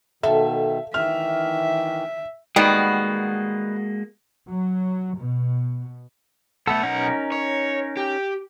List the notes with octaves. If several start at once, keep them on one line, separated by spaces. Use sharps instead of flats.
B2 D#3 A4 E5 F5
D#3 E3 E5 F6
D#3 G3 G#3 A#3 B3 F#4
F#3
B2
B1 A3 B3 A4 F#5
C#4 D#4 A#4
C#5
G4